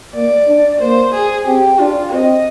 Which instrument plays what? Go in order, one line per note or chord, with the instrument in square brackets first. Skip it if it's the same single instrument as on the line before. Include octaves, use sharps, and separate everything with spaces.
[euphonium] A#3 [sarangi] D5
[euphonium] D4
[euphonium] A#3 [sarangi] C5
[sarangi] G#4
[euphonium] C4 [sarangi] G4
[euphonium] D4 [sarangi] F4
[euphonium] C4 [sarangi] D#5